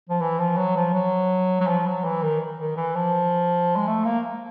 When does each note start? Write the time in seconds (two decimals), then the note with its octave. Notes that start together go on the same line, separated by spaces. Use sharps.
0.10 F3
0.21 E3
0.39 F3
0.57 F#3
0.76 F3
0.94 F#3
1.60 F#3
1.67 F3
1.86 F#3
2.04 E3
2.22 D#3
2.59 D#3
2.76 E3
2.95 F3
3.76 G#3
3.87 A3
4.05 A#3